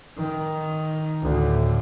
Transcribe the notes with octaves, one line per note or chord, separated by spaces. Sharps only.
D#3
D2 A2